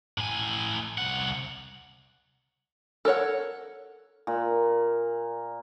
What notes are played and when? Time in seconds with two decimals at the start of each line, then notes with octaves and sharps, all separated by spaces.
0.18 A2 G#5
0.98 C2 F#5
3.05 A4 A#4 C#5 F#5
4.27 A#2